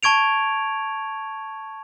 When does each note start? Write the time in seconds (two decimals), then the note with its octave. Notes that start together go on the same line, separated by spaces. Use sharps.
0.03 A5 C#6 G#6 D7 F7